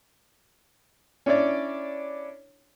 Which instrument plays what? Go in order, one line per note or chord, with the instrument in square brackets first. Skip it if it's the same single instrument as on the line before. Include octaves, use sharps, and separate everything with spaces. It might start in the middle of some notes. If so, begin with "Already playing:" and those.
[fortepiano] C#4 D4 E4 C#5 D5